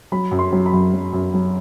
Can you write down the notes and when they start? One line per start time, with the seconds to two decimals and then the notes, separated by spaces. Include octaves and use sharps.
0.12 F#3 B5
0.31 F#2
0.39 C6
0.52 F#3
0.66 B5
0.73 F#2
0.93 F#3
1.13 F#2
1.34 F#3